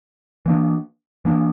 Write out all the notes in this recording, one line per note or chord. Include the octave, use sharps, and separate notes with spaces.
E3 A#3 D4
E3 A#3 D4